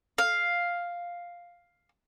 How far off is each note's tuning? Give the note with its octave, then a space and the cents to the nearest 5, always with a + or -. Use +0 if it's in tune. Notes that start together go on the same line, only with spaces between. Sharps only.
F5 +5